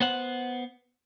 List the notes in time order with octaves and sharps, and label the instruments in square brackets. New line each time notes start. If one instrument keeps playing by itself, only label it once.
[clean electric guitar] B3 C5 F#5